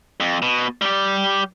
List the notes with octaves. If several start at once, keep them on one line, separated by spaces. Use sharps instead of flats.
F2
B2
G3 G4